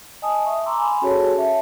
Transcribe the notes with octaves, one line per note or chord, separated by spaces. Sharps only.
D#5 G#5 A5 D#6
E5 C#6
A#5 C6 D6 E6
G#5 B5 C6
C#4 F#4 G#4 A4 C#5 A5
E5 A5